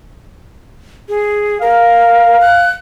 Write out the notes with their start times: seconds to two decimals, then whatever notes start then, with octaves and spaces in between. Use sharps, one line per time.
1.09 G#4
1.61 A#4 F5
2.41 F#6